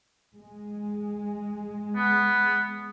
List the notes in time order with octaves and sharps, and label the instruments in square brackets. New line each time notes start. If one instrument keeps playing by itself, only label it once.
[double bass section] G#3
[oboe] B3